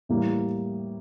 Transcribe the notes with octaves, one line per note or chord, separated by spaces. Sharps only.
A2 E3 G3 A#3